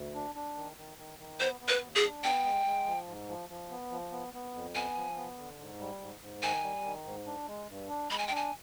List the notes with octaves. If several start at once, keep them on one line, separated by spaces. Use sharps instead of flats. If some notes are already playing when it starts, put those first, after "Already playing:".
Already playing: D2
D4
D4
D#3
D#3
D#3
D#3
B3 C5
B3
B4
D#2
G#4
D4
B3 G5
G#3
G#3
F3
G#2
F3
F3
B3
F3
B3
B3
F2
B3 G#5
F3
B3
D3
G#2
G3
G#2
G#2
D#3 G#5
G3
D#3
G#2
D4
G#3
G2
D4
G#3 B5
G#5
G5
D4 G#5